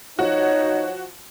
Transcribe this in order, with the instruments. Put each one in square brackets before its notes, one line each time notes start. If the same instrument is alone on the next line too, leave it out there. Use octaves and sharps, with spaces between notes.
[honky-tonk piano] F3 F#4 [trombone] D#4 [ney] C#5